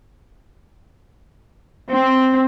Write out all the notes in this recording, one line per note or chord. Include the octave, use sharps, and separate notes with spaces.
C4